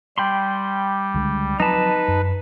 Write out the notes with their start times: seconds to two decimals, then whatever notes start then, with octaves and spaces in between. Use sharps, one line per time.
0.18 G3 G5 B5 C6
1.14 C#2 D3 G#3
1.60 F3 F#3 C4 D#4 B4 A5
2.08 F#2